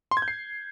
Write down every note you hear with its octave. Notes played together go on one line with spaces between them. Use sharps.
C6
G#6
G6
C7